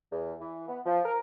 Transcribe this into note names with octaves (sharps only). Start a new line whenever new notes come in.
E2
E3
B3
F3
A#4